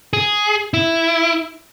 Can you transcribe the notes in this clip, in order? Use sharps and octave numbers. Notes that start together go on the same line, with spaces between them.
G#4
E4